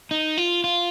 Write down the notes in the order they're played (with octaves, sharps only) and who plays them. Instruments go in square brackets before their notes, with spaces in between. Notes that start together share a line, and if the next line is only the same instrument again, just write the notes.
[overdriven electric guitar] D#4
F4
F4